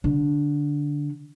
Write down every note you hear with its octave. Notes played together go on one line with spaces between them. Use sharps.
D3